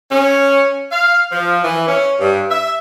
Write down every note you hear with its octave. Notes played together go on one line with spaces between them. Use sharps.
C#4
F5
F3
E3
C#4
G2
E5